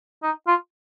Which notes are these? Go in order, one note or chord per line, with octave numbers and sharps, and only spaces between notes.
D#4
F4